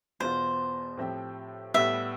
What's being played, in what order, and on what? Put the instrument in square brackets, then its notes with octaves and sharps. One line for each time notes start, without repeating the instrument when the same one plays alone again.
[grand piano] E2 B2 B3 F4 [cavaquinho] C5
[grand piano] A2 F3 C4 G4
[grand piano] A2 G3 B3 [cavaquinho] E5